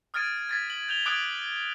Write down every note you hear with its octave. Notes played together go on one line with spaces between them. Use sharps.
D#6 F6 G#6 A6 D7 D#7
G#6 A6 B6
F#7
G6 F7 G7
D6 D#6 F#6 G#6 D7